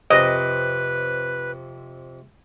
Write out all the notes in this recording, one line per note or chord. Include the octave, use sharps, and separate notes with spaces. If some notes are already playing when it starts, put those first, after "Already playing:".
F2 C3 B4 D#5